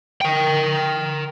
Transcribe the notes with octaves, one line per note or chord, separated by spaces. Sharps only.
A#4 G5